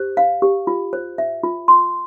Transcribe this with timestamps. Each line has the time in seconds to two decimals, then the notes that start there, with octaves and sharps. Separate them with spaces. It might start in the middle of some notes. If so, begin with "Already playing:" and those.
Already playing: G4 C5
0.17 F5
0.42 G4
0.67 F4
0.93 C5
1.18 E5
1.43 F4
1.68 C6